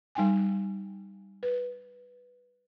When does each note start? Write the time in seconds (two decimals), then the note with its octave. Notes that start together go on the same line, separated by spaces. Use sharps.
0.15 G3 D#4 G5 G#5
1.43 B4